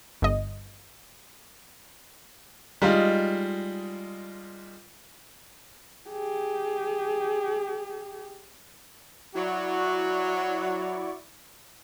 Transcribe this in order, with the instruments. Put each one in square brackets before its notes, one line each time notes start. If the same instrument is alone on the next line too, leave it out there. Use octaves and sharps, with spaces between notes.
[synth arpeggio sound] G1 D#5
[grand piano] G3 G#3 D#4 F4
[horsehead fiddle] G4 G#4
[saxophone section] F#3 [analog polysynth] E4 D5 C#6 [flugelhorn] F#4